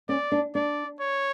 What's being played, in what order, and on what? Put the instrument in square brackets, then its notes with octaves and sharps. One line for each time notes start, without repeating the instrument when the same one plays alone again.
[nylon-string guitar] C#4 [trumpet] D5
[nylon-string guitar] D4
[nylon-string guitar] D4 [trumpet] D5
[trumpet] C#5